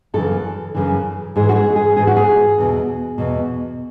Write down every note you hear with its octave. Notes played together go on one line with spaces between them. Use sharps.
F#2 C#3 E3 A4
F#2 C#3 E3
G#2 E3 G#4
F#4
G#4
G#4
G#2 E3 G#4
F#4
G#4
E2 B2
E2 B2